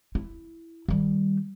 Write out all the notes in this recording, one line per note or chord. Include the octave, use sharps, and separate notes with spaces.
E4
D#3 G3